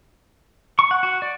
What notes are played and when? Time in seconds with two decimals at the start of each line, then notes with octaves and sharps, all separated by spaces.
0.79 C#6
0.91 F#5
1.03 F#4
1.22 D5